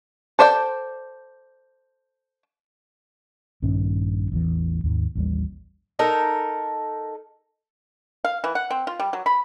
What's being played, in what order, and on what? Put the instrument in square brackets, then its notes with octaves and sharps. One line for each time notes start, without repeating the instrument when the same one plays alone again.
[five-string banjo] A4 C5 D5 E5 G5
[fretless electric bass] A#1 G2 D#3 C#4
A1 E2 E3
D#2 G#2
A1 D#2 G3
[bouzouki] D#4 A4 A#4
[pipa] F5
E3
F#5
C4
F4
G3
F#3
B5